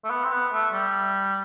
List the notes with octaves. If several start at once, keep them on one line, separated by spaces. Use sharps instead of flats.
A3
B3
C4
B3
A3
G3